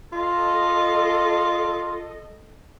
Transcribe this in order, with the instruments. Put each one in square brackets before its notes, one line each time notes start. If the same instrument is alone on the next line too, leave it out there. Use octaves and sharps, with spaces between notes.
[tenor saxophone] F4 [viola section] A4 D#5